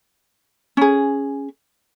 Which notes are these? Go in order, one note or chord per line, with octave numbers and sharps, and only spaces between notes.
C#4 G#4